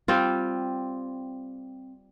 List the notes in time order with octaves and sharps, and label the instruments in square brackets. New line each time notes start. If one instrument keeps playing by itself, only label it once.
[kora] G3 C4 F4